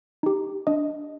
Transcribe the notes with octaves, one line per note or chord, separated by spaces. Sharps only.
D#4 G4
D4 D#5